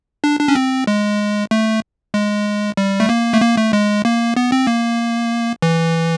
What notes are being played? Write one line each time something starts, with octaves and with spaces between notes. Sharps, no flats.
D4
D4
C#4
C4
G#3
A3
G#3
G3
A3
A#3
A3
A#3
A3
G#3
A#3
B3
C4
A#3
E3